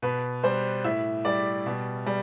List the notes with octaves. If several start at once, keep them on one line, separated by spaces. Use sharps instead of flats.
B2 B4
G3 C5
A2 E5
G3 D5
B2
G3